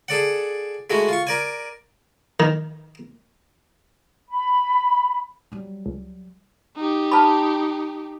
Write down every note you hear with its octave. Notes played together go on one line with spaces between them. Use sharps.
G#4 A4 D5 F#5
G#3 A3 E4 F#4
F4 C#6
A#4 D5 G#5
D#3
B5
F#3 G3
C#2
D#4 G4
A5 B5